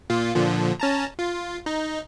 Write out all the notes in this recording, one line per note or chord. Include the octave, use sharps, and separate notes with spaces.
A#2 F4
A#2 D3 F3
C#4 A5 A#5
F4
D#4